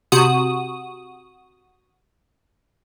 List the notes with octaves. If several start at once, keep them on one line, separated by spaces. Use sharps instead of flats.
C3 F#4 D#6